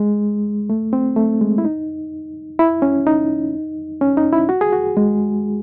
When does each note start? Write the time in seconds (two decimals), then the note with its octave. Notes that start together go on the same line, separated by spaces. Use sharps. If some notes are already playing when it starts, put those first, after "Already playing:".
Already playing: G#3
0.70 A3
0.93 C4
1.16 A3
1.41 G#3
1.58 E4
1.65 D#4
2.59 E4
2.82 C#4
3.07 D#4
4.01 C#4
4.17 D#4
4.33 E4
4.49 F#4
4.61 G#4
4.72 F#4
4.97 G#3